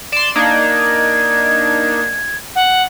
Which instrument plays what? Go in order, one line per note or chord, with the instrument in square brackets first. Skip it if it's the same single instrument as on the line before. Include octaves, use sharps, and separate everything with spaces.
[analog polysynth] D5 C6 [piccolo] E7
[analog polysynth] A#3 D4 D#4 [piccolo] G#6
[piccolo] F#5